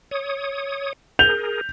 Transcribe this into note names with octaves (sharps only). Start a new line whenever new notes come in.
C#5 D#6
G#4 A#4 G6 F7